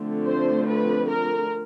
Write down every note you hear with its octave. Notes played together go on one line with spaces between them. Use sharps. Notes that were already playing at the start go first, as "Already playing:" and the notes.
Already playing: D3 F3 A3 C4
C5
B4
A#4